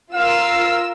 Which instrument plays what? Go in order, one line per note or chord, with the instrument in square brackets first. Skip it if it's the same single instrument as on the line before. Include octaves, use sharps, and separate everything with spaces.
[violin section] F4 A#4 E6 [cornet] F5